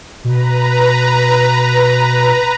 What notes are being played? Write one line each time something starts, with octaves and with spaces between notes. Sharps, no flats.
B2 B4 A#5